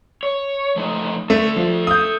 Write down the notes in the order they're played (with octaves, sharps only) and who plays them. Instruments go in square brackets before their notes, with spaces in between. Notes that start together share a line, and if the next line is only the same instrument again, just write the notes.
[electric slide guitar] C#5
F3 A3 D#4
[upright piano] A3 [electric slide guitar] A4 D5 E5
[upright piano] F3
D#6 G6